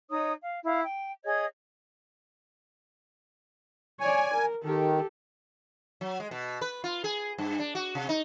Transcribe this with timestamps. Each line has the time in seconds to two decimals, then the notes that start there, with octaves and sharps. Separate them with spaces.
0.10 D#4 C#5 D#5 D#6
0.42 F5
0.64 E4 F5
0.83 G5
1.25 G#4 C#5 D#5 G#6
4.01 C#5 D5 G#5
4.34 A#4
4.64 D#3 G4 A4
6.01 F#3
6.20 G#3
6.31 B2
6.61 B4
6.84 F4
7.04 G#4
7.38 G2
7.59 D4
7.75 F#4
7.95 C3
8.09 D#4